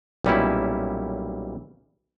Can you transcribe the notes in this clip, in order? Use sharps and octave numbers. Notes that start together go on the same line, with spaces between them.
B1 A#2 G3 C#4 E4